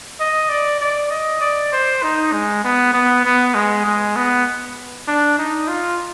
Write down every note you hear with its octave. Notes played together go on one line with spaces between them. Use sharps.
D#5
D5
D5
D#5
D5
C5
D#4
G#3
B3
B3
B3
G#3
G#3
B3
D4
D#4
F4